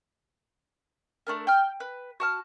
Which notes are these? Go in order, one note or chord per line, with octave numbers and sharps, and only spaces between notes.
A3 D4 A#4
G5 F6
B4
F#4 A5 F6